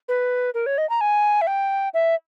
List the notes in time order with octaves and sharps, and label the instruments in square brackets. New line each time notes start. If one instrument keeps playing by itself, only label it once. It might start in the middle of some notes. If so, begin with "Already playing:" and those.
[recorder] B4
A#4
C#5
D#5
A#5
G#5
E5
G5
E5